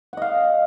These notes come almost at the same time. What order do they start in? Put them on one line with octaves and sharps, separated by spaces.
F#5 D#5 F5